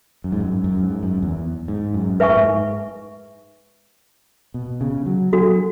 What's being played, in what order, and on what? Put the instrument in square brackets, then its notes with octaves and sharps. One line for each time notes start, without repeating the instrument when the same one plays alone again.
[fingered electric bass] F#2
G#2
F#2
F#2
G#2
F#2
E2
G#2
F#2
[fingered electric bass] G#2 [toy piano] B4 E5 G#5 C#6
[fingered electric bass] A2
G#2
B2
C#3
F#3
[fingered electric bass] F#3 [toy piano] D4 F#4 A4